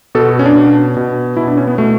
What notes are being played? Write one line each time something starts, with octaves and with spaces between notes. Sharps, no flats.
B2 A4
F#4
C#4
D4
B2
B2
B2 E4
D4
C#4
B3
B2 A3